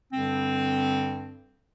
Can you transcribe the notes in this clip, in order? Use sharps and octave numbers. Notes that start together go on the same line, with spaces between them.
G2 D3 G3 C4